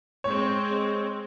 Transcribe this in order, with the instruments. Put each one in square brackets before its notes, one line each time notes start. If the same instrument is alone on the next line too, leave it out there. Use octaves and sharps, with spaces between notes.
[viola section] G#3 C4 [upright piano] C#5